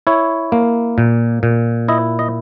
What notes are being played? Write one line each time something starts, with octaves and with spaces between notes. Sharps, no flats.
E4 C#5
A#3
A#2
A#2
E4 D#5
D#5